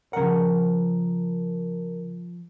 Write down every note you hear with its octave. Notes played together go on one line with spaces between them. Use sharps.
C#3 F3 A#4 F#5